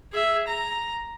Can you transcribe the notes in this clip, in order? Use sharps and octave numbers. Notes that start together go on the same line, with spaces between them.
G#4 E5
A#5